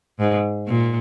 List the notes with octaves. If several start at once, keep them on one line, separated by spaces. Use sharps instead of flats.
G#2
A#2